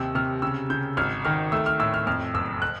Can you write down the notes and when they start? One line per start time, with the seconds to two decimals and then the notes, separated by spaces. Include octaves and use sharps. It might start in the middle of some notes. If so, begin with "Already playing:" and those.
Already playing: D#2 C3 E6
0.15 C3 F6
0.42 C#3 E6
0.70 C#3 G6
0.97 G#1 F6
1.25 D#3 F6
1.52 A3 E6
1.66 F6
1.79 A2 E6
1.94 F6
2.07 F2 F6
2.34 F#1 E6
2.62 F#6